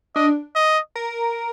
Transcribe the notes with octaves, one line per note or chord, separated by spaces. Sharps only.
D4 D#5
D#5
A#4